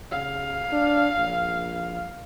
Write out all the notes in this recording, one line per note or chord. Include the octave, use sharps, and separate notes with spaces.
C#3 F5
D4
A#1